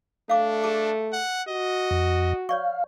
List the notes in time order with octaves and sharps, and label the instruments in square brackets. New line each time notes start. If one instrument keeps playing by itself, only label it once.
[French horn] A3 [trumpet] D4 [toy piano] F5 D6
[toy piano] G#4 A5 D6
[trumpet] F#5
[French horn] F#4 [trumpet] D#5
[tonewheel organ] F2
[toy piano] C#5 D5 C#6 [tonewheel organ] F5